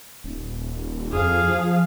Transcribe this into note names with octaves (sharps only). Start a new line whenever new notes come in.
D#1
F2 G#4 F5
F3